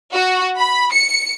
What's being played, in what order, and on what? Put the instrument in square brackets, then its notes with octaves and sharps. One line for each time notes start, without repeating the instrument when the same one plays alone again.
[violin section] F#4
B5
C#7